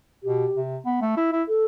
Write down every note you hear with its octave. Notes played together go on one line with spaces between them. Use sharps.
B2 G4
C3
B3
A3
E4
E4
A4